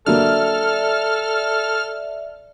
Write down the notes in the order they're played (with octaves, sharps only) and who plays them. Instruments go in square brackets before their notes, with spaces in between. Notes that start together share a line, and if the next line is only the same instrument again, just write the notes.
[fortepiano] D3 F#3 A#3 [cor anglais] A4 [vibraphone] D5 E5 [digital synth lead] F6